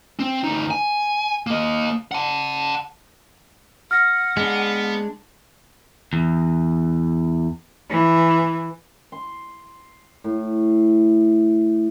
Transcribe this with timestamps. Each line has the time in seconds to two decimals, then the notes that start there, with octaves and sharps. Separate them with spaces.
0.19 C4
0.44 D2 D#4
0.71 G#5
1.47 A#3 D#5
2.12 F#5 A5
3.91 F#5 F6 A#6
4.37 G#3 B3 D4
6.13 E2
7.89 E3
9.12 C6
10.24 A2